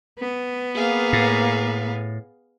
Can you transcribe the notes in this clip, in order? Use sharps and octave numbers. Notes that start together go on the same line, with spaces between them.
B3
A#3 G#4 F5
A2